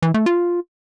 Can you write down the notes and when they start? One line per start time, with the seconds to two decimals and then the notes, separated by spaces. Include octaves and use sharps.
0.02 E3
0.14 A3
0.26 F4